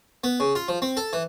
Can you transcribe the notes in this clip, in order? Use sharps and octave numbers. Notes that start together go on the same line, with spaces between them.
B3
C#3
F4
F3
C4
A4
E3